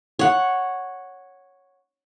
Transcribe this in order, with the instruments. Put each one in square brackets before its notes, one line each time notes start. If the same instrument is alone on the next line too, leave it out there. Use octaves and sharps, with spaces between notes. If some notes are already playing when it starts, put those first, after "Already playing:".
[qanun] C#5 F#5